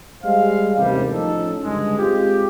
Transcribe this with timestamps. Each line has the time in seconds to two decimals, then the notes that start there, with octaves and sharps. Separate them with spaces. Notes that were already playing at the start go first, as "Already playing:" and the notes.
0.23 G3 G#3 C5 F5
0.76 A1 D#2 G#2 C3 D#3 G3
1.12 A2 F3 C#4 D#4 A4
1.63 C#2 G2 D3 G#3
1.97 G#3 C4 F4 G4